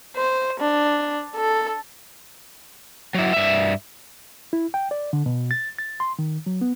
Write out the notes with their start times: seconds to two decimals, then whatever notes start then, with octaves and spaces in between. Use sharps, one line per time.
0.16 C5
0.59 D4
1.36 A4
3.14 F#3 E4
3.33 G2 E5
4.53 E4
4.74 G5
4.91 D5
5.13 D3
5.26 B2
5.51 A6
5.79 A6
6.00 C6
6.19 D#3
6.46 F#3
6.61 B3